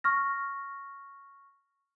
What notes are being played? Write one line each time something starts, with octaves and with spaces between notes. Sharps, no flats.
C#6 F6 A#6